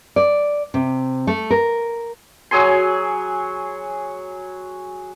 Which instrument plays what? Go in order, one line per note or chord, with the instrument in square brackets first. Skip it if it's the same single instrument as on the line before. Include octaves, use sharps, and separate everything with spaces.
[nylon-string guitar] D5
C3
A3
A#4
[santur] F#3 G#4 G#5 C6